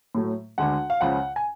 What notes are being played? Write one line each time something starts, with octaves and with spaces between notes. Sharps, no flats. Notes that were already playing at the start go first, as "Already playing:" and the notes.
A2 F#3 A3
D2 D3 G#3 F#5
F5
C#2 C#3 F3 F#5
G#5